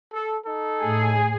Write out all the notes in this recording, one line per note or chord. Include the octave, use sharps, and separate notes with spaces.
A4
D#4 A4
A2 G#4